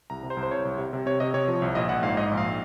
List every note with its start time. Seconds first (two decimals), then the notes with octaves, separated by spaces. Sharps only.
0.10 C2 A#5
0.23 C3
0.30 C5
0.37 C2
0.43 C5
0.51 C2 C#5
0.65 C2
0.78 C3
0.93 C3
1.06 C3 C#5
1.20 C3 D#5
1.34 C3 C#5
1.48 F3
1.62 C2
1.75 A#1 D#5
1.89 A#1 F#5
2.03 G#2 F5
2.17 G#2 D#5
2.31 A#1
2.37 F5